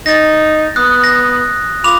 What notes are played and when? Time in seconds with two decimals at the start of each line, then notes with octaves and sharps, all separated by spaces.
0.06 D#4 A6 A#6
0.76 B3 D#6 F#6
1.04 A#6
1.84 F4 B5 D6 F7